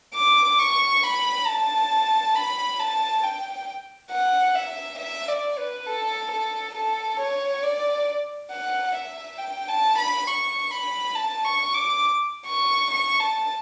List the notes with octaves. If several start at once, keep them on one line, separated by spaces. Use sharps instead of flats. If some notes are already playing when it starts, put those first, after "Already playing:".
D6
C#6
B5
A5
B5
A5
G5
F#5
E5
E5
D5
B4
A4
A4
A4
C#5
D5
F#5
E5
G5
A5
B5
C#6
B5
A5
C#6
D6
C#6
C#6
A5